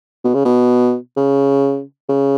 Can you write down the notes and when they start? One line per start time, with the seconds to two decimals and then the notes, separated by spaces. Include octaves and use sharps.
0.24 B2
0.34 C#3
0.45 B2
1.17 C#3
2.09 C#3